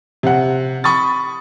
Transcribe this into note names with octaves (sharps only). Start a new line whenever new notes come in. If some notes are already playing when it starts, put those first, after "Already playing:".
C3 F#5
B5 C#6 D#6 A6